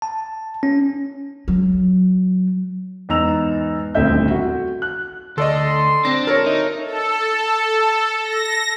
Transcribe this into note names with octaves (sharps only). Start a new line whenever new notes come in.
A5
C#4
F#3
E2 G#2 D#4 A#5 E6 F7
D#1 D2 A3 C4 E5 G6
F#4
F#6
D2 A4 D5 D#5 C6
C4 D4 A#6
F#4 A4 A#4 C#5
D#4 E5
A4
A#6